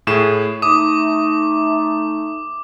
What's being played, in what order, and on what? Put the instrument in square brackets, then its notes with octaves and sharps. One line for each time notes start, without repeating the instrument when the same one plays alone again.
[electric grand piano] A2 G#4 E7
[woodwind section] A3 D#4 [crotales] D6 [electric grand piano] D#6